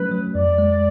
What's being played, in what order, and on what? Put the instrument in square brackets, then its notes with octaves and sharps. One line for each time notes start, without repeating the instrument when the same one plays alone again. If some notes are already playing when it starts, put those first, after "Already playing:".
Already playing: [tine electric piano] F#3 A3 C#4 [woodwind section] B4
[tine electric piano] F#3
[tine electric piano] F2 [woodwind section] D5
[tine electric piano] G#3